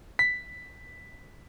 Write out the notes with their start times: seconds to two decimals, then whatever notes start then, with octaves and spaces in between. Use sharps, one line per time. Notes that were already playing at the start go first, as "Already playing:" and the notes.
0.19 B6